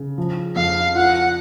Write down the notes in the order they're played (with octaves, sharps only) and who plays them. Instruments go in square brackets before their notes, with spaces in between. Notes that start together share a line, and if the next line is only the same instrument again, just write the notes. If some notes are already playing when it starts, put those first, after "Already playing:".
Already playing: [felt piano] C#3
F3
[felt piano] F2 [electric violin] F5
[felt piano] F4 [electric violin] F#5